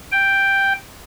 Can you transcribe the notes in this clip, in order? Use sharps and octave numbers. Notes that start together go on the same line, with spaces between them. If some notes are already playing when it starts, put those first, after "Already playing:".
G5